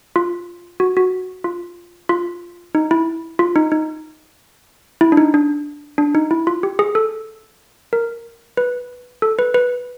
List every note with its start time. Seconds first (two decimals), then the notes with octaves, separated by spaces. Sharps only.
0.16 F4
0.80 F#4
0.97 F#4
1.44 F4
2.09 F4
2.75 D#4
2.91 E4
3.39 F4
3.56 D#4
3.72 D#4
5.01 E4
5.12 D4
5.17 D#4
5.34 D4
5.98 D4
6.15 D#4
6.31 E4
6.47 F4
6.63 G4
6.79 G#4
6.95 A4
7.93 A#4
8.57 B4
9.22 A4
9.39 B4
9.54 B4